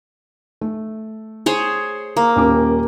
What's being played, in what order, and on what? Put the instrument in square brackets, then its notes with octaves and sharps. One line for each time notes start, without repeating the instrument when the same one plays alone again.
[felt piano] A3
[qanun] G#4 C5 C#5
A#3
[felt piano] D#1 C#4 D6